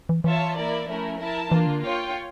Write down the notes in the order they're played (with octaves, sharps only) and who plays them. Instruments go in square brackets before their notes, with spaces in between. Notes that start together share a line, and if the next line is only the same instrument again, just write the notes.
[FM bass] E3
[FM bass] E3 [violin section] F4 C#5 E5 A5
[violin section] A#3 E4 A#4 D5
[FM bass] F3 [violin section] A3 C#4 E4 A#4
[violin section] E4 A#4 E5 A5
[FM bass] E3 [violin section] A#3 D4 F4
[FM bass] D3
[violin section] F4 C#5 G5